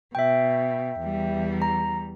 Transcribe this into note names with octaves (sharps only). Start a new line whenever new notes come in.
B2 E5 G5
E2 G3
A#5